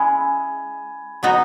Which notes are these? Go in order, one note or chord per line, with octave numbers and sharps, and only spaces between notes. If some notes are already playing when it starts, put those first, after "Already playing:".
Already playing: G#3 C#4 E4 G#4 G#5 B5
F#3 B3 D#4 F#4